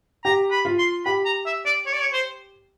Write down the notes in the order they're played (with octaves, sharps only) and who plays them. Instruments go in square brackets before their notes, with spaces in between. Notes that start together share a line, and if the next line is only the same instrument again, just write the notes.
[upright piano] G4 [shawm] A#5
[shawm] B5
[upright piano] F4
[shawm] C6
[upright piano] G4 [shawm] B5
[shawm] A#5
E5
D5
C#5
D5
C#5
C5